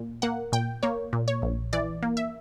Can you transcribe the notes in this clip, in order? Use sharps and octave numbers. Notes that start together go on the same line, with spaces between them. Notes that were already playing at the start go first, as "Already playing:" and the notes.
Already playing: A#2
A#3 F#5
A#2 G5
A#3 C#5
A#2
C#5
A#1
E3 D5
A#3
E5